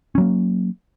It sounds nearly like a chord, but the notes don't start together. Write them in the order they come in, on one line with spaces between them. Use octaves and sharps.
C#4 F#3 A#3